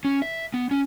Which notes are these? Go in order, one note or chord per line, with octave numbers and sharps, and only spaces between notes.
C#4
E5
B3
C#4